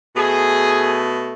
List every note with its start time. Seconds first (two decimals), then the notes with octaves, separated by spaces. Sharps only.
0.16 B2 A3 G#4